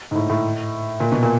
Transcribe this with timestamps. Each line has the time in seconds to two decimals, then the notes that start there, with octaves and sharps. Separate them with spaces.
0.11 G#2
0.15 A2
0.30 A2
1.00 A#2
1.12 B2
1.23 A#2